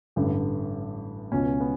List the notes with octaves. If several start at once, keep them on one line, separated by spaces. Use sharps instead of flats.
A1 G2 D3
C#2 B2 C#4
B3